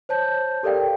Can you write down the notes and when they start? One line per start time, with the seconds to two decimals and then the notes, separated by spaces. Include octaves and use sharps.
0.09 C5 C#5 A5 G6
0.63 G4 A4 A#4 D5 F5 G5